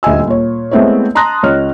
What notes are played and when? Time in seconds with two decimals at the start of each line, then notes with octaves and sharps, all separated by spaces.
0.03 D#1 D2 D#5 G#5 E6
0.27 A#2 C#5
0.71 G#3 A3 B3 C4 E4 C#5
1.15 A5 A#5 C6 D#6 F#6 A#6
1.43 C#2 C#5 D#5 F6